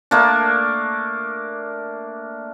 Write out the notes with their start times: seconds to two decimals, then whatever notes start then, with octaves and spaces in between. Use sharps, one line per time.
0.11 A3 A#3 D4